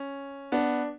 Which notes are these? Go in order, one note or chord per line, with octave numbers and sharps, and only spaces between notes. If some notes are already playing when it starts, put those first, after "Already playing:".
Already playing: C#4
B3 D4